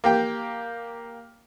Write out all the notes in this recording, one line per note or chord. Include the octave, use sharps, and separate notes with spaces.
A#3 G4 G5